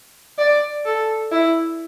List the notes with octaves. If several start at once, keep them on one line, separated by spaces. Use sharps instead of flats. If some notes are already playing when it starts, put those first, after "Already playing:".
D5
A4
E4